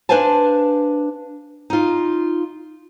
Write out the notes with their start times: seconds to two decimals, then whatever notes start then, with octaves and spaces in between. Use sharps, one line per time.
0.09 D4 B4 C5 F5 G#5 A5
1.70 D#4 F4